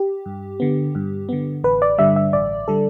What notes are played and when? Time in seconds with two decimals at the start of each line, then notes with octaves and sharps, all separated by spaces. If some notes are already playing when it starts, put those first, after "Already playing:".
Already playing: G4
0.26 G2
0.60 D3 B3
0.95 G2
1.29 D3 B3
1.64 A1 B4
1.82 D5
1.98 G2 D3 G3 E5
2.16 E5
2.33 A1 D5
2.68 D3 G3 A4